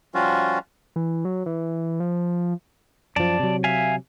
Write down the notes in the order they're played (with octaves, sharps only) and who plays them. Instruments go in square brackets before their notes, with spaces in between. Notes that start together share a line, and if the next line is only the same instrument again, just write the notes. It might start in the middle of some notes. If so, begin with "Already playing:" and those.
[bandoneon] F3 G3 C#4 F4 F#4
[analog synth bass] E3
F#3
E3
F3
[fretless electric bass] F#2 F3 [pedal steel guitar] D5 A5
[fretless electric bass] C3 F#3
[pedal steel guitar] E5 F5 G#5